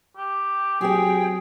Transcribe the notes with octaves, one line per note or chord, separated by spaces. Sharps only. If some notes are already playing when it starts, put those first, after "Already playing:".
G4
F#3 C4 G4 G#4 G5